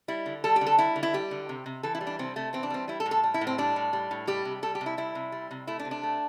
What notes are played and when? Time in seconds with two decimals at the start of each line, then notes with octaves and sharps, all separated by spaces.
0.08 G3 E4
0.26 D3
0.44 G3 A4
0.56 G4
0.61 D3
0.66 A4
0.78 G3 E4
0.96 D3
1.03 E4
1.13 G3 G4
1.31 D3
1.49 C3
1.66 C3
1.83 E3 A4
1.95 E4
2.01 G3
2.07 D4
2.19 C3 C4
2.36 C3 A3
2.53 E3 C4
2.63 D4
2.70 G3 C4
2.88 G3 E4
3.00 A4
3.06 A2
3.11 A4
3.23 G3
3.34 E4
3.41 A2
3.47 C4
3.58 G3 D4
3.76 A2
3.93 G3
4.11 A2
4.27 G3 G4
4.45 C3
4.63 G3 A4
4.75 G4
4.81 C3
4.86 E4
4.97 G3 E4
5.15 C3
5.32 G3
5.51 C3
5.67 A3 E4
5.79 D4
5.85 C3
5.91 D4
6.03 A3